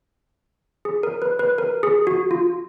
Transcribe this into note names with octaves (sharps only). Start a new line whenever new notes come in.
G#4
A#4
B4
B4
A#4
G#4
F#4
F4